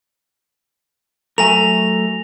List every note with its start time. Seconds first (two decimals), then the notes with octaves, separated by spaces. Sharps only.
1.38 F#3 A3 A#4 G#5 A#6 F7